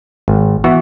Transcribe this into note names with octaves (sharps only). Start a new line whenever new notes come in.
G#1
E3 B3 F#4